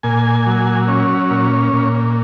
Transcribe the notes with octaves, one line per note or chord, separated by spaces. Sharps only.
A#2 G#5
F#3
C#4
A#2
A#2